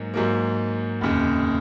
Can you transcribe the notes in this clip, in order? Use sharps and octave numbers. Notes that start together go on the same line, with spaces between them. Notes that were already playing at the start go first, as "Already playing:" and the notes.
Already playing: G#2 F#3 A#3
G#2 F#3 A#3
F1 D#2 C#3